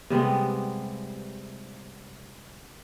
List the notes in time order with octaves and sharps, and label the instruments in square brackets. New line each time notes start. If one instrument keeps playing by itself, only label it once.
[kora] C3 G3 G#3 B3